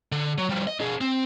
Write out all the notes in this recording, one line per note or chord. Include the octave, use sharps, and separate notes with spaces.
D3
F#3
F3 G3
D#5
D4 G#4
C4